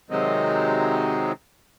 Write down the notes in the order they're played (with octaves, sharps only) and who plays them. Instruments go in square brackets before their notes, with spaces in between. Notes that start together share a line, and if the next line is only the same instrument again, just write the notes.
[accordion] C3 D#3 F#3 G#3 C4 D#4